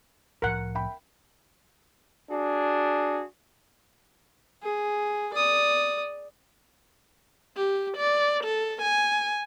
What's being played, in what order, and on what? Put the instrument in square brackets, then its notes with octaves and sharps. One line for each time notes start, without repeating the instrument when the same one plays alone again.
[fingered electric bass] C2 A2 F3 [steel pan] A#4 F#5
[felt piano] E5 G5 B5
[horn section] D4 F#4 G#4
[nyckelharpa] G#4
D5 D#6
[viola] G4
D5
A4
G#5